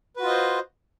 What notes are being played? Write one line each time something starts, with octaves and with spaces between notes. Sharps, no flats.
F4 F#4 B4 C5 D#5